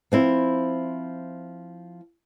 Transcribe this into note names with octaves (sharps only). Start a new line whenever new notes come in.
F3 C4 E4